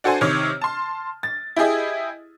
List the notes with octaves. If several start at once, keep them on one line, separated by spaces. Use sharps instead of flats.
D4 F#4 A4 C5 G#5
C3 D#3 C#5 F6
A5 C6
A6
E4 G4 G#4 D#5 E5